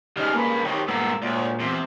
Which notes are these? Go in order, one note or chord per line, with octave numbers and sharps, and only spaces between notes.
C#3 G3 G#3 D#4 G#5 F6
G2 A#3 B4
G#2 D#3 G4 A#4 C#5 D#6
G2 A#2 G#3 B3 A#4 E6
D2 A#2 C#5 D5
E2 C3